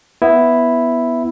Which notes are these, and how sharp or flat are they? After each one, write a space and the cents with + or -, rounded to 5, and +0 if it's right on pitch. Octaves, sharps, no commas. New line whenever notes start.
B3 +0 E4 +0